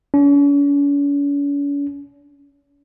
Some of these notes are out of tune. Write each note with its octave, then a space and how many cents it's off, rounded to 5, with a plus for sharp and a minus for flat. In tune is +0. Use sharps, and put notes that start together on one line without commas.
C#4 +45